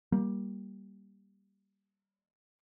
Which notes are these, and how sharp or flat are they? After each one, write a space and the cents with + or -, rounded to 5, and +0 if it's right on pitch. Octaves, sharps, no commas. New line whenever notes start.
G3 +0 A#3 +15